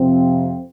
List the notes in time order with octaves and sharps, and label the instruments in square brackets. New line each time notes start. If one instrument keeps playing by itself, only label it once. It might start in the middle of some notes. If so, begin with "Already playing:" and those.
Already playing: [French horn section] F2 C3 F3 C4